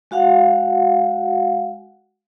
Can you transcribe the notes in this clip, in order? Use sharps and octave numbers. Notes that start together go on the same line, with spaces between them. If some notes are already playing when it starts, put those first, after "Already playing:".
G#3 F#4 F5 F#5